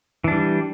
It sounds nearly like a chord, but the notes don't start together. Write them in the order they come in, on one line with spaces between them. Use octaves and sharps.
E3 D4 G3